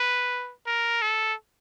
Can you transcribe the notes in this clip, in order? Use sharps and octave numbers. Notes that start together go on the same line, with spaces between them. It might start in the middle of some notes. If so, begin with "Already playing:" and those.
Already playing: B4
A#4
A4